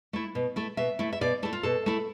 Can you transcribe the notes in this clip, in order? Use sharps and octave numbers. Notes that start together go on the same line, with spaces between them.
A3 E4
B2
A3 E4
B2 E5
A3 E4
E5
B2 D5
A3 E4 A4
F4
B2 A4
A3 E4